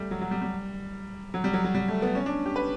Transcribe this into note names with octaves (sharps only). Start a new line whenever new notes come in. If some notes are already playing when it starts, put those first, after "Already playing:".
Already playing: G3 A3
F#3
F#3
G3
G3
F#3
G3
F#3
F#3
G3
A3
B3
C#4
D4
G4
B4